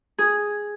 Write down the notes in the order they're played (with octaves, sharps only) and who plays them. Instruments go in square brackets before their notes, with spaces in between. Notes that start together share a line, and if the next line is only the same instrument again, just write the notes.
[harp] G#4